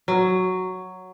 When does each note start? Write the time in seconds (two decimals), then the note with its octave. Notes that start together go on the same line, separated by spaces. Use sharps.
0.08 F#3